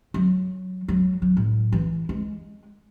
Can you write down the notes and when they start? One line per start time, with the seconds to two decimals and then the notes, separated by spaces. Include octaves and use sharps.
0.14 F#3
0.88 F#3
1.22 F#3
1.37 A2
1.72 E3
2.09 G#3